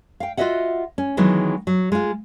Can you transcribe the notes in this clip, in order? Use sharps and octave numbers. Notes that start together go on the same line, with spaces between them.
F5 G5
F4 F#4 C#5 D#5 E5 F#5
C#4
D#3 E3 F#3 G#3 B3
F#3
G#3 F4